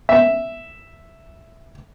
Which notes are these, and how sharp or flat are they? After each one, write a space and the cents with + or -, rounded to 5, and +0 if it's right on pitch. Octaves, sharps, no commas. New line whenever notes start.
E5 +0